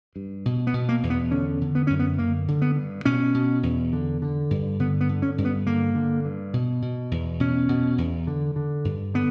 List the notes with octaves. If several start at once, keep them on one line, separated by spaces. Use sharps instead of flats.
G2
B2
B3
B2
A#3
E2
B3
D3 C#4
D3
B3
F#2 C#4
B3
D3 A#3
D3
B3
G2
B2 C#4
B2
E2
D3
D3
G2
D3 B3
B3
D3
C#4
G2
B3
D3 A#3
D3
G2
B2
B2
E2
B2 C#4
B2
E2
D3
D3
G2
D3 B3